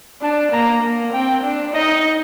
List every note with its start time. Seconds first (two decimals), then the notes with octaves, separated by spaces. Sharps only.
0.22 D4 A5
0.52 A#3 A#5
0.84 A#3
1.13 C4 G5
1.44 D4
1.74 D#4 D#5